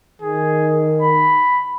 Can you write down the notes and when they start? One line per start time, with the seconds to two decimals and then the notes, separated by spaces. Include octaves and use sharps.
0.22 D#3 G#4
1.02 B5